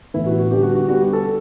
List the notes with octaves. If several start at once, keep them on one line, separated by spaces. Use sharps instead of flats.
A2 E3 B3 E4
F#4
F#4
D3 G3 B3 G4
F#4
F#4
D3 G3 B3 F#4
G4
A4